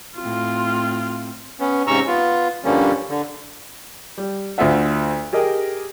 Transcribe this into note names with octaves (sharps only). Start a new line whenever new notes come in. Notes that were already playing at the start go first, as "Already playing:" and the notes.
A2 C4 F4
B3 C#4
G#2 C3 C#4 A#5 C#6 E6
B3 F4
G2 D3 F3 G3 A#3 C#4
D3
G3
D2 D4 F4 E5 F#5
G4 G#4 A#4 D#5 G5